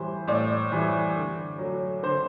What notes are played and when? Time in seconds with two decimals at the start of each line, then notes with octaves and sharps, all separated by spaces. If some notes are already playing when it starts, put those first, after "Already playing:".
Already playing: A2 E3 G3 C5
0.27 A2 D5
0.72 E3 G3
1.16 D3
1.59 F#3 A3
2.03 D3 C5